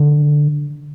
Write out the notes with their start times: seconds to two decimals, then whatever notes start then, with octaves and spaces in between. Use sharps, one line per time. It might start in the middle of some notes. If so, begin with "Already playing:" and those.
Already playing: D3